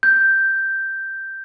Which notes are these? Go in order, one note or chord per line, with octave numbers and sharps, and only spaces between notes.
G6